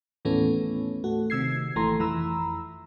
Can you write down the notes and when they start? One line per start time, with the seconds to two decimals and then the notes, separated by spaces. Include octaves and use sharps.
0.25 D#2 A2 E3 A3 B3 C#4
1.04 A3 F#4
1.30 C3 D#3 E6 G#6 C7
1.76 G#1 E3 A3 A#5 C6
1.99 F2 E3 A#5 B5 E6